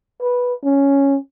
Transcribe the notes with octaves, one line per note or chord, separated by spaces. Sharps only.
B4
C#4